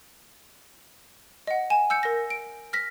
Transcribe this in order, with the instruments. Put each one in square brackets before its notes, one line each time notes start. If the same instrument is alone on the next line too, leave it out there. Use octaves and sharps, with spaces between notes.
[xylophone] D#5 F#5
G#5 E7
E6 G6 C#7
A#4 A#6
D7
F6 A#6 B6